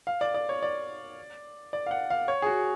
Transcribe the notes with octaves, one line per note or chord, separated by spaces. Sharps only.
F5
D5
D5
C#5
D5
D5
F5
F#5
F5
C#5
G#4
F#4